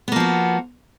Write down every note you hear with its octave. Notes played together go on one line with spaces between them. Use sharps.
F3 A#3 B3 F#4